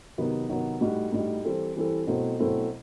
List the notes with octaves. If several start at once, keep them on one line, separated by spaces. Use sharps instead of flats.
C3 D#3 F#3 B3
C3 D#3 F#3 B3
A2 G3 D#4 F#4
A2 G3 D#4 F#4
E3 G3 C4 E4 A4
E3 G3 C4 E4 A4
B2 F#3 A3 C4 E4
B2 F#3 A3 C4 E4